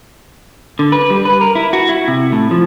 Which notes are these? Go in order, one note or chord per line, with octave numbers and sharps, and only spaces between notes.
D3
B4
G3
B4
A#4
E4
F#4
E4
C3
A2
F3